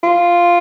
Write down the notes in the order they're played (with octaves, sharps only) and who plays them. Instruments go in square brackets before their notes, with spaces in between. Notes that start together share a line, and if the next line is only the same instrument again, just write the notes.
[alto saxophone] F4